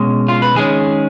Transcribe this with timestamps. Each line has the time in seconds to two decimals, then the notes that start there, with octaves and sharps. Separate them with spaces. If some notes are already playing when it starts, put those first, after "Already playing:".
Already playing: B2 G#3 C#4
0.28 F4
0.42 B4
0.55 D#3 G#3 C#4 G#4